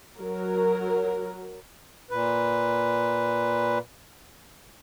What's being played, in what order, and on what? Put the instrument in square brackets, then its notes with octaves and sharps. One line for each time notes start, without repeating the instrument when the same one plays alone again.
[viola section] F#3 A#4
[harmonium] A#2 B4